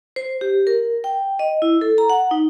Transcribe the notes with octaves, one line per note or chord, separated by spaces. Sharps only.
C5
G4
A#4
G5
D#5
E4
A4
A#5
F#5
D#4